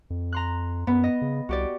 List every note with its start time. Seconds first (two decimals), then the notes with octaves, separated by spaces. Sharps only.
0.10 F2
0.32 A#5 C6 F#6
0.87 F#2 B3
1.04 D#5
1.22 C#3
1.49 C2 F#4 G4 D5